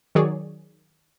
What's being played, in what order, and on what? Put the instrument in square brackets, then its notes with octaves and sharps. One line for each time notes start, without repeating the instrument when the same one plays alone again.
[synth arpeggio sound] D#3 F#3 G#4 C#5 D5